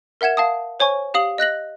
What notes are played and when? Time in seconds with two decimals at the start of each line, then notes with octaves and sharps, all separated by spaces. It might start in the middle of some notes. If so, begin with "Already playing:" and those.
0.21 A#4 E5 F#5 G#6 E7
0.37 F5 A5 D#6
0.80 C5 C#5 G#5 C#6
1.14 G4 F5 D#6 F#7
1.38 D#5 F#6 A#6 F#7